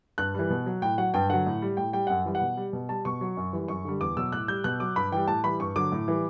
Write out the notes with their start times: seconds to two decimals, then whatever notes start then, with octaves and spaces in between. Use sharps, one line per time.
0.18 G2 F#6
0.34 E3 G3
0.50 B2
0.66 F#3
0.82 A2 G5
0.98 F#3 F#5
1.14 G2 G5
1.30 D3 F#3 F#5
1.46 A2
1.62 G3
1.77 A2 G5
1.93 G3 G5
2.07 F#2 F#5
2.25 E3 G3
2.35 F#5
2.41 B2
2.57 G3
2.73 B2
2.89 G3 A5
3.05 B2 C#6
3.21 F#3
3.37 F#2
3.53 E3 G3
3.68 F#2 C#6
3.85 D3 G3
4.01 E2 D6
4.17 B2 F#3 E6
4.32 A2 F#6
4.48 G3 G6
4.64 B2 F#6
4.80 F#3 D6
4.96 G2 B5
5.12 E3 G3 G5
5.28 A2 A5
5.44 E3 G3 B5
5.60 G2 C#6
5.76 D3 F#3 D6
5.92 A2
6.08 E3 G3